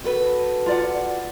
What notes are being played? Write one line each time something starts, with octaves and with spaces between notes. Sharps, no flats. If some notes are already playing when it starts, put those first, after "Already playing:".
F#4 A4 B4
F4 D5 F#5